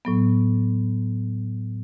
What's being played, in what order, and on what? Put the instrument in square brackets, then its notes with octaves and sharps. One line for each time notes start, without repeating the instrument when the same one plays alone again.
[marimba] A2 F#3 B3